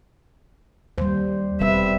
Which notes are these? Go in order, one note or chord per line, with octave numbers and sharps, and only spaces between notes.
D#2 G3 C5
E1 G3 C4 B4 E5